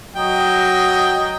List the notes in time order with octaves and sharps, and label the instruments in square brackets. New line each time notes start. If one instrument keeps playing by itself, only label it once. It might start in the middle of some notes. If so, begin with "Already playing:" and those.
[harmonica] F#3 D#5 G5